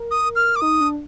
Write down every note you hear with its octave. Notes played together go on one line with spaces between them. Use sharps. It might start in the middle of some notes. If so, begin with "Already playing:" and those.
Already playing: A#4
D#6
F6
D6
D#4 D#6
D4